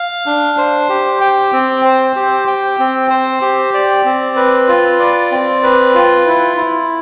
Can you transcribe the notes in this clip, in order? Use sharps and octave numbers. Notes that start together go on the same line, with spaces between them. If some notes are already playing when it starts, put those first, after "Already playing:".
Already playing: F5
D4
C5
G4
G5
C4
C5
G4
G5
C4
C5
G4
D5
C4
B4
F4
D5
C4
B4
F4
E4
E4